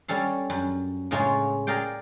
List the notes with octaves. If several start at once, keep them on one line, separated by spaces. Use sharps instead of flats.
G3 C#4 A4 F5
F#2
A2 C#3 G#3 A#3 C#4 F4
G#4 A#4 D5 F5 G5